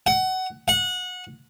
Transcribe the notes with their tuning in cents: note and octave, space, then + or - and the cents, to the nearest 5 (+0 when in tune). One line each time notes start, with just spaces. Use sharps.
F#5 +20
F#5 -25